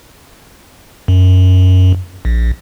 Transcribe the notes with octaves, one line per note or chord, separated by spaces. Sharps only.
F#2
A#1